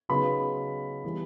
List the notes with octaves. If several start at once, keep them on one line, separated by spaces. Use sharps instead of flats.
C#3 F#3 B3 D#4 B4 B5
E3 G3